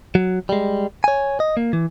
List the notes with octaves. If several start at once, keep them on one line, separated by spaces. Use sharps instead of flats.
F#3
G3 G#3
C#5 G#5
D#5
A#3
E3